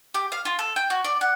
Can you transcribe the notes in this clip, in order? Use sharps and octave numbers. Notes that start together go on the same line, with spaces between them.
G4
F5
F4
A4
G5
F#4
D5
F#5